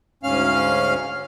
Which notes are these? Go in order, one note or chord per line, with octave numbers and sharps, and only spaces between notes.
D2 G#2 C#4 F5 F6